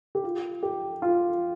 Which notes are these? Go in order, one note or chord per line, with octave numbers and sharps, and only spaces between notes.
G4
F4
G4
F4